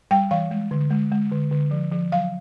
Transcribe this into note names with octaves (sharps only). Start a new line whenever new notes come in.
G3 G5
E3 F5
G#3
D3
G#3
G#3
D3
D3
F3
F3
F#3 F5